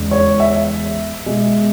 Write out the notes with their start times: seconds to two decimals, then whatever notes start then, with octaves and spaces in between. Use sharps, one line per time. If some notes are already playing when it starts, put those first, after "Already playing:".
Already playing: E2 C#3 G#3
0.11 C#5
0.40 E5
1.26 B2 G#3